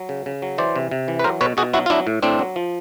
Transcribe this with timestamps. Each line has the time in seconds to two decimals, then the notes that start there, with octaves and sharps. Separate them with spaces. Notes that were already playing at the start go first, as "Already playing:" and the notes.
Already playing: F#3
0.09 C#3
0.26 C#3
0.42 F#3
0.58 E3 C5 D5
0.76 C3
0.91 C3
1.08 E3
1.19 B4
1.24 F#3 A#4 C5
1.41 B2 B4 C#5
1.57 B2 F#4 G#4
1.73 F#3 E4 F#4
1.86 F4
1.90 F#3 D4 E4
2.07 A2
2.23 A2 C4 D4
2.39 F#3
2.56 F3